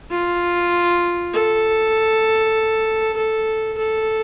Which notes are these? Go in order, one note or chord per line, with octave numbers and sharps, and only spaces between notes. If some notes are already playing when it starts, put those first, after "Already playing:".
F4
A4
A4
A4